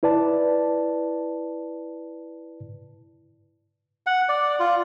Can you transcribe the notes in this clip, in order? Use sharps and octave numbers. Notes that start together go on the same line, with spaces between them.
E4 B4 D5 A5
F#5
D5
F4